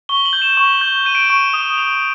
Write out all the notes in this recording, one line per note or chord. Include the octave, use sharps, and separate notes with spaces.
C#6 G7
F#7
G6
E7
C#6
G6
G6 D#7
D7
D#7
C#6
D#6
D#6